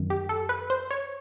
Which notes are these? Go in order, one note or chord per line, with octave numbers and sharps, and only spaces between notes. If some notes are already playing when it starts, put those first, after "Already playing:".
Already playing: F#2 D#3
G4
A4
B4
C5
C#5